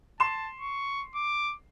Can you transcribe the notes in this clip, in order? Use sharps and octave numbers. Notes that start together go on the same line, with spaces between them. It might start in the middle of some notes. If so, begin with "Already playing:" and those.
A5 C6 E7
C#6
D6